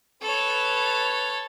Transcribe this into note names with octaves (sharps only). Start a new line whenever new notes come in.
A4 B4 C#5